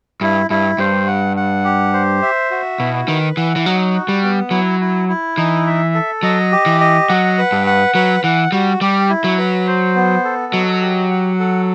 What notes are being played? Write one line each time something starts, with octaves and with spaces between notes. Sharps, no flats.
G2 E4
G2 E4
G2 C5
F#5
F#5
G4
C5
E5
F#4
B2 E4
D#3 B4
E3 F#5
E3
F#3 D#4
F#4
G3
B3
F#3 E4
E4
E4
E3 D#4
E5
A4
F#3 D#5
G4
E3
D#5
F#3 F#5
B4
G2
F#5
F#3 B4
E3 F#5
G3 F#4
G3 G4
E4
F#3
B4
C5
B3
A4
F#3 D#5
G4
F#5
A4